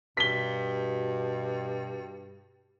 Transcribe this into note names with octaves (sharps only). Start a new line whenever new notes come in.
G2 B2 B6 G7